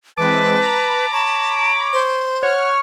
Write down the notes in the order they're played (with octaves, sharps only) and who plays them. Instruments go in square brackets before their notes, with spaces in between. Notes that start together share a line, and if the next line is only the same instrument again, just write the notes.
[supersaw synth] E3 G#3 C4 [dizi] B4 [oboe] A5 [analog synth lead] D6
[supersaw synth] A#5 B5
[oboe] C#5 [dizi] A5
[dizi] C5
[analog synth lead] C#5 [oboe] F#5 [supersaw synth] F6